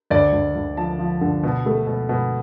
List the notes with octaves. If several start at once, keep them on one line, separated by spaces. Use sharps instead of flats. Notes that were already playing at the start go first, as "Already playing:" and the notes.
D2 D5
D2
D2
F3 A5
F3
D3
B2
A3
B2
B2